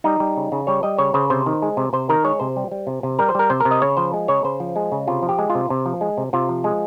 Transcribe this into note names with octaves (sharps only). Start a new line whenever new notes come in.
G3 D#4
G3
C#3
C#3
G3 C#5
G3 D#5
C#3 C#5
C#3 C5
C3 C5
D#3
G#3
C3
C3 C5
D#3 A#4
G#3 C#5
C3 C5
G3
G3
C3
C3
G3 A#4
C5
G3 A#4
C3 C5
C3 A#4
D#5
C#3 C#5
F3 C5
G#3
C#3 C#5
C#3 C5
F3
G#3
C#3
C3 F4
F3
G4
G#3
F4
C3
C3
F3
G#3
C3
C3 F4
F3
G#3